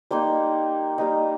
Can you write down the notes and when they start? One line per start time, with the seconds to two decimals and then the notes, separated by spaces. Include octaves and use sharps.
0.11 G3 A#3 D#4 C6
0.98 G3 A#3 D#4